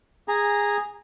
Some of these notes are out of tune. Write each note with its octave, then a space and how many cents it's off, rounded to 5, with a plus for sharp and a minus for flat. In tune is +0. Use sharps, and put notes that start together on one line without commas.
G#4 -10 A#5 +0